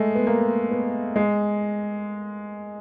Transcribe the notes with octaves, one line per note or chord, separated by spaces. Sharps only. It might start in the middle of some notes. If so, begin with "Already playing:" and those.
Already playing: G#3 A3
B3
A#3
B3
G#3